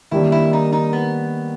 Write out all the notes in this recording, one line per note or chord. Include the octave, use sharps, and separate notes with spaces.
D#3 G3 A#3 D4 E4
E4
D#4
D#4
B3